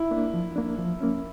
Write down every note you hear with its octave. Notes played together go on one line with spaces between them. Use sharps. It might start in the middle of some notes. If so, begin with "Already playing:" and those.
Already playing: E4
A#3 D4
F3
A#3 D4
F3
A#3 C#4